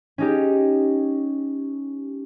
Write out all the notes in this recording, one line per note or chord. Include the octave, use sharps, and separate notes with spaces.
C#4 D#4 G4